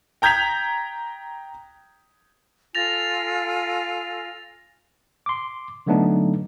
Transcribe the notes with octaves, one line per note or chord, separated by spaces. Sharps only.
G5 A#5 G6 G#6 B6 F7
F4 A4 G#5 A6 A#6 F7
C6 D6
D3 F#3 A3 B3 D4 D#4